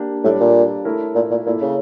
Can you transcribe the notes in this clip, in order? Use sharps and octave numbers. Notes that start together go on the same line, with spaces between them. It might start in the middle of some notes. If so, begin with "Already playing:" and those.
Already playing: A#3 D4 G4
A2 G3 D4 A4 D5
A#2
A3 E4 A#4 C#5
A#2
A#2
A#2 A#3 E4 A4
C#3